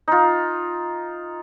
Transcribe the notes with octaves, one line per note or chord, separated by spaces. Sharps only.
D#4 F4